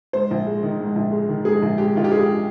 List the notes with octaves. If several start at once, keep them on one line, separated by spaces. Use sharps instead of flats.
G#2 C5
A#1
G#3
D#3
G#2
A#1
G#3
D#3
G#2 G#4
A#1
G#3 G4
D#3 F4
G4
G#2 G#4